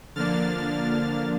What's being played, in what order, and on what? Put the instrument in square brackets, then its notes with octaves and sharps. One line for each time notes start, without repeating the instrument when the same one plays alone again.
[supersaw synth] D3 F3 A#3 D4 F6 A6